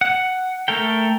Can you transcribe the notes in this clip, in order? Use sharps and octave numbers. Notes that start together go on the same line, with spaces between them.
F#5
A3 A4 A#4 G5